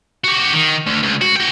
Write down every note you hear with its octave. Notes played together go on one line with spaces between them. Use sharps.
F#4 G4
D#3
D2
C#2
F#4
F#4 G5